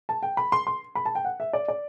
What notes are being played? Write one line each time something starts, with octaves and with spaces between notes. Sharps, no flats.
A5
G5
B5
C6
C6
B5
A5
G5
F#5
E5
D5
D5